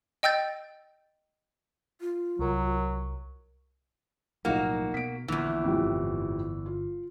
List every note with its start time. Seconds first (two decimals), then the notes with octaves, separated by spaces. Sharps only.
0.23 D#5 G5 E6 G6 A6
2.01 F4
2.39 C2 F#3 A#4
4.45 B1 A2 F3 A#3 D#4 F#4 F#5
4.94 B2 B6 D7
5.28 A#1 E2 A#2 D3 E3
5.64 F2 A2 G3
5.84 G1
6.66 F4